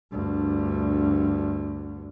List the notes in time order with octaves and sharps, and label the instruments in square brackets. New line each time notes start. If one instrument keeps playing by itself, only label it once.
[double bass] D2 G2